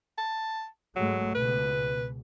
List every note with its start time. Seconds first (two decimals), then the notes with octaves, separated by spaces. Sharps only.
0.18 A5
0.96 G#2 F#3 G#3 A3
1.35 C#2 B2 B4